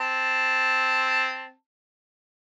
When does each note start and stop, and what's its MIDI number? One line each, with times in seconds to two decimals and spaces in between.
0.01 1.52 60
0.01 1.52 81